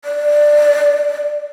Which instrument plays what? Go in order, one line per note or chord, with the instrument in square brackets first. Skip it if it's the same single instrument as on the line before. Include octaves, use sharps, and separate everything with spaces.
[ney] D5